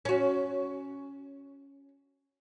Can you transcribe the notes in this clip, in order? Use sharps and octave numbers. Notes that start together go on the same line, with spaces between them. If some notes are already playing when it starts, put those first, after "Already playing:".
C#4 F#4